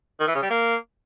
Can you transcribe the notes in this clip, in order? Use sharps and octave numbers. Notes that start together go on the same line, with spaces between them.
D#3
E3
C#3
G3
A#3